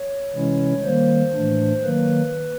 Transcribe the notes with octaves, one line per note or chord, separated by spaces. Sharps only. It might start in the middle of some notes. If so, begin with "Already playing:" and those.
Already playing: C#5
C3 E3 G#3 C#4 E4
D#3 G3 A#3 C5
A2 E3 A3 D4
D#3 F#3 A#3 B4